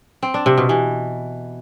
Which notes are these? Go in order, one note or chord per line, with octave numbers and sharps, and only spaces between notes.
C4
D4
C3
B2
E3